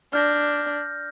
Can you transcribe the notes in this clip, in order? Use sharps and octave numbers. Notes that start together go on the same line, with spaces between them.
D4 F6 G6 A#6